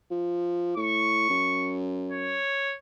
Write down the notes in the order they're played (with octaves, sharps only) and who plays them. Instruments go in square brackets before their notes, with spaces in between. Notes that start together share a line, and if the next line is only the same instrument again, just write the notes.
[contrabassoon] F3
[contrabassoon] A2 [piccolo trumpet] C#6
[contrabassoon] F#2
[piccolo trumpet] C#5